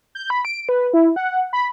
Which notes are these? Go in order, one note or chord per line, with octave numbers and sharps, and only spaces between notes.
G6
B5
D7
B4
E4
F#5
B5